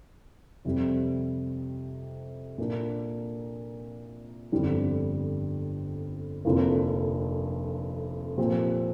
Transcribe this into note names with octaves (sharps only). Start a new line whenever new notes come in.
F2 C3 G3
A#2 A#3 D4
G1 F2 D3 G3
F1 F2 D3 A#3 F4
A#2 F3 C4 G4